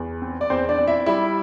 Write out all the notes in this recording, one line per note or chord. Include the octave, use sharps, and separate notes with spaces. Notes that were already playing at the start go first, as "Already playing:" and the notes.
Already playing: E2
C4
D5
E2 C4 C5
D4 D5
C4
E4 E5
G3 E4 E5